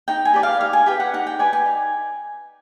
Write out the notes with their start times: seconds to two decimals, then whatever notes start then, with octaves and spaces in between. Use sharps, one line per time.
0.08 D#4 G5
0.25 G#5
0.34 G4 B4 D5
0.43 F5
0.61 D#4 F5
0.73 G#5
0.86 G4 B4 D5 G5
1.00 F#5
1.13 D#4 F#5
1.27 G5
1.39 G4 B4 D5 G#5
1.53 G#5
1.66 D#4